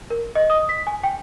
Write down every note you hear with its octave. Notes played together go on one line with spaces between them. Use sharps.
A#4
D#5
D#6
B6
G#5
G5